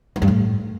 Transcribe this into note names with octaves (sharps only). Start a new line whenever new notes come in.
E3
G2
A2